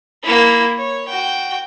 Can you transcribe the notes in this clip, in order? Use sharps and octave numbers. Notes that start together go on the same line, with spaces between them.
A#3 E4
C#5
F#4 G5